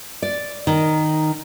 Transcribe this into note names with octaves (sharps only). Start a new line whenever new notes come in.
D5
D#3